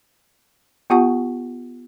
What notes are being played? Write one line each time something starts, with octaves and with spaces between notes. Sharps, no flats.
B3 F4 G4 F#5 A5 C#6